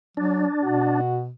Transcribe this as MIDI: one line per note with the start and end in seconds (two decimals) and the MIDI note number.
0.17 0.46 54
0.17 1.01 62
0.63 1.31 47
0.63 1.21 66